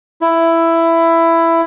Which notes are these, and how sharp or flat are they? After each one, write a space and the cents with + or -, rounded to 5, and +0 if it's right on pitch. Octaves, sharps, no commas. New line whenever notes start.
E4 +10